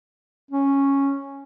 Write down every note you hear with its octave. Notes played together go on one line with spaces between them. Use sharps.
C#4